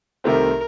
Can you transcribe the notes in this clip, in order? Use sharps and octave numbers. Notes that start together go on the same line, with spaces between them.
C2 C3 D#3 A3 C4 A#4